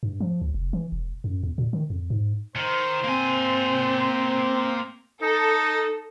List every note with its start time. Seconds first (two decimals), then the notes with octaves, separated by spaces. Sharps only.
0.03 G2
0.20 F3
0.41 D2
0.54 F1
0.73 E3
0.92 E1
1.24 F#2
1.43 E2
1.58 A#2
1.73 D#3
1.90 F2
2.10 G#2
2.56 D#3 C5
3.04 A#3 C4 G#5
5.22 D#4 A4